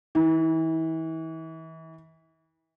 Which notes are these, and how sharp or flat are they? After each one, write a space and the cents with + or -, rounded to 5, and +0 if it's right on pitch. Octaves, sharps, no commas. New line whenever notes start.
E3 -35